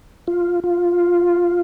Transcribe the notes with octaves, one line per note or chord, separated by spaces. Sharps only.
F4
F4